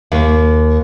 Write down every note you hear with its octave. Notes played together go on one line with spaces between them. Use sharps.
D#2